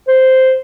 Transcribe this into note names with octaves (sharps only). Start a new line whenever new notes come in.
C5